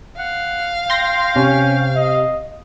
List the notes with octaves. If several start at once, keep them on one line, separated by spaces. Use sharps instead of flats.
F5 F#5
G5 C6 A#6
C3 C#4
D#5